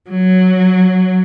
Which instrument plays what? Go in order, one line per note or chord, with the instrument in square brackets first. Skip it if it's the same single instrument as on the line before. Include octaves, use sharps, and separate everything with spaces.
[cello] F#3